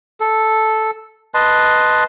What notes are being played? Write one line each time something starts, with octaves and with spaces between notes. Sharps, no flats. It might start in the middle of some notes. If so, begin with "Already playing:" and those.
A4
B4 D#5 A5 C6